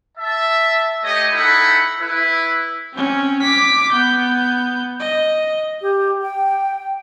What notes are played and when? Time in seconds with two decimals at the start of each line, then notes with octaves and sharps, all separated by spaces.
0.18 E5 A5
1.04 A3 G4 C#5 D#5
1.32 D#4 E4 A4 F#5 G5 B5
2.01 E4 B4
2.93 C4 C#4
3.42 D6 B6
3.92 B3 G6
5.00 D#5
5.82 G4
6.21 G5